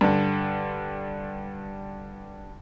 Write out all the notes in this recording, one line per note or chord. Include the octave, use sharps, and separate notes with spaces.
G2 D3